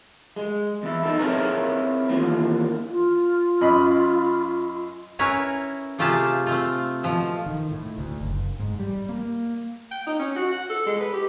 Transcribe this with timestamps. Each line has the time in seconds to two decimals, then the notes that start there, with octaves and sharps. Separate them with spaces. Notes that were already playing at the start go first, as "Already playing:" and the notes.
0.36 G#3
0.83 E2 E4
1.03 D#4 A4
1.20 C4 E4 G#4 A#4 B4 C#5
2.09 D#2 E3 A#3 F4
2.88 F4
3.61 F#2 D#5 B5
5.19 C#4 E4 A#4 B4 C#5
5.98 C3 A3 F4 G4 G#4 A5
6.46 A3 C4 F4
7.03 B2 F3
7.46 D#3
7.71 A2
7.98 D2
8.21 F#1
8.59 G#2
8.79 G3
9.09 A#3
9.91 G5
10.07 D#4
10.19 C#4
10.36 F#4
10.52 F#5
10.70 A4
10.86 G#3
11.00 B4
11.14 G4